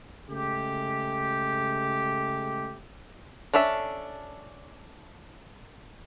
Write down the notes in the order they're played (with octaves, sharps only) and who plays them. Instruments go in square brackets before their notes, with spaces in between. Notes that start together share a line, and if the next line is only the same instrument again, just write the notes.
[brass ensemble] C#3 G#3 A3 G4
[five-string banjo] C#4 D4 A4 E5